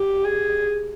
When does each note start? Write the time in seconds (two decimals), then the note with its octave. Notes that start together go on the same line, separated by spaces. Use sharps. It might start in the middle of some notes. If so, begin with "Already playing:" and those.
Already playing: G4
0.24 G#4